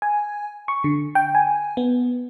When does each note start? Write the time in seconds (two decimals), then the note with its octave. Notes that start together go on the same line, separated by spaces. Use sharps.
0.02 G#5
0.68 C#6
0.84 D3
1.15 G5
1.35 G#5
1.77 B3